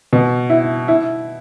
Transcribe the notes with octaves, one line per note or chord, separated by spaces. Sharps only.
B2
E4
E4